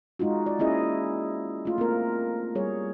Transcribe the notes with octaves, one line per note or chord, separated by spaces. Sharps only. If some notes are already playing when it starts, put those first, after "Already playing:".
G#3 D#4 F4 F#4
D5
A#3 C#4 E4 G#4 D#5
A3 F4
A#3 C4 A#4
G3 G#4 C#5